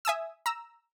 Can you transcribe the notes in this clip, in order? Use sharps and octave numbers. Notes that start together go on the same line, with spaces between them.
E5 G#5 D#6 E6
A#5 E6